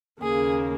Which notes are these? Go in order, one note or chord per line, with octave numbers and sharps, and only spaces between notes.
D#2 C#3 A#3 G#4